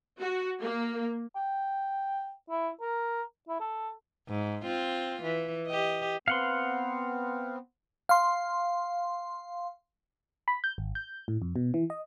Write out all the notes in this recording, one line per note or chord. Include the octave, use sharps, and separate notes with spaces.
F#4
A#3
G5
E4
A#4
E4
A4
G#2
C4 F4
E3
G4 D#5
B3 C4 F5 F#5 C6
F5 C6
B5
G6
G#1
G6
A2
F2
B2
E3
D#5